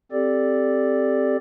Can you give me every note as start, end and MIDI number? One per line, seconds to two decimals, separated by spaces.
0.12 1.37 60
0.12 1.37 67
0.12 1.37 69
0.12 1.37 74